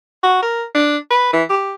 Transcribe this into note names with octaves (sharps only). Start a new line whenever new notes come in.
F#4
A#4
D4
B4
E3
G4